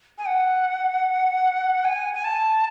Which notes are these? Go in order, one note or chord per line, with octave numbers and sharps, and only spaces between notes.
G#5
F#5
G#5
G#5
A5